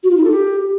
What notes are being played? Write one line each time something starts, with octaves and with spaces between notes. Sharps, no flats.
F#4
F4
D#4
A4
G4